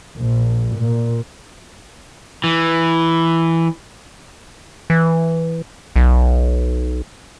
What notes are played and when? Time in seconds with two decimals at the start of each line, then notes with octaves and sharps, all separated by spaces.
0.17 A#1
0.76 A#2
2.44 E3
4.90 E3
5.96 B1